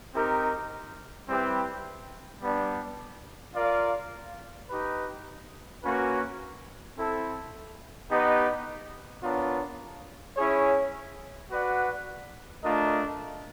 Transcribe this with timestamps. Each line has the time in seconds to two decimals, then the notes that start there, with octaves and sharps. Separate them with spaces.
0.14 C4 D#4 G4 A#4
1.28 G3 C4 E4 G4 B4
2.41 G3 B3 D4
3.55 F4 A#4 D5 F5
4.70 D#4 G4 B4
5.83 A#3 C#4 F#4 B4
6.97 C4 E4 A4
8.10 B3 D#4 G4 B4 D#5
9.23 B3 D4 F4 A#4 C#5
10.37 C#4 E4 G#4 C#5
11.51 F#4 B4 D5 F#5
12.64 A3 D4 F4 A#4 D#5